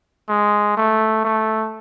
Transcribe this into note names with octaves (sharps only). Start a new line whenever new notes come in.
G#3
A3
A3